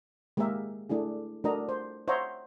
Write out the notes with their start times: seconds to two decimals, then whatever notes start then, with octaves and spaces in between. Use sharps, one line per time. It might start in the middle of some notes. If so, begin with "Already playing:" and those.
0.37 G#3 A#3 G4 G#4 A#4 E5
0.89 A3 D4 E4 G#4
1.44 A3 D4 F#4 A#4 D#5 A#5
1.69 C5
2.08 C5 C#5 D#5 E5 F#5 A#5